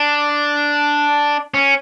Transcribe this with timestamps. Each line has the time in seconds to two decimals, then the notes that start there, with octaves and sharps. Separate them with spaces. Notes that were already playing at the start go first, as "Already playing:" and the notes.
Already playing: D4
1.54 C#4